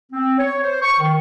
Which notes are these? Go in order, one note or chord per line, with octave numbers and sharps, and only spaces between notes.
C4
C#5
C5
C#6
D#3